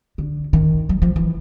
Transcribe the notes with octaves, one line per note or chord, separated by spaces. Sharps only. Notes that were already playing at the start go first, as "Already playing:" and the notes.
D3
D#3
F#3
F3
E3